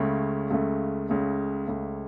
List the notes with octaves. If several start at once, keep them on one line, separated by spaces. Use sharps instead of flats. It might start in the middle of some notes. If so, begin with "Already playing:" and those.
Already playing: C#2 C#3 A3
C#2 C#3 A3
C#2 C#3 A3
C#2 C#3 A3